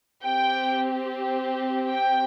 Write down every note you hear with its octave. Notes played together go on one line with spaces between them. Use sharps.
C4 G4 G5
G5